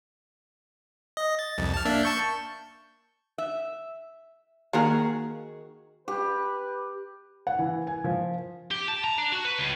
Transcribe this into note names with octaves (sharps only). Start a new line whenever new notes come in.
D#5
A6
C2 F2
A5 F6
A#3 D4 E5
A5 C#6 G6
E5
D#3 A#3 F#4 G#4 A#4
G4 B4
F#5
E3
G#5
F3
G4
A5
A#5
D4
F#4
B4
C#2